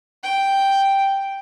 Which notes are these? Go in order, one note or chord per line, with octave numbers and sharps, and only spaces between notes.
G5